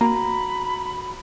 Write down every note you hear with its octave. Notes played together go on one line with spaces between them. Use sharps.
A#3 F#4 A#5 B5